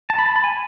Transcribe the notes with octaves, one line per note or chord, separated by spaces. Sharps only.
A5
B5
A5
B5
G#5